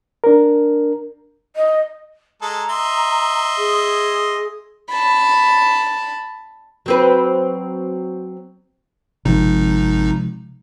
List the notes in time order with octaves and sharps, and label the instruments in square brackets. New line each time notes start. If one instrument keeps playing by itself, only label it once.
[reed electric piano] D4 A#4
[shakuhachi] D#5
[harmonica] G#3 A4 [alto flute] A#5
[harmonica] D#5 E5 C6
[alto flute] G#4
[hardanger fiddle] A5 B5
[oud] F#3 C4 B4
[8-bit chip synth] G#1 D#4 [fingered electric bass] C3 F3 G#3